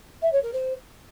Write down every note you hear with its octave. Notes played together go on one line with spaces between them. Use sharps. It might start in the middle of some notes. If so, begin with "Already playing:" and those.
E5
C#5
A#4
C5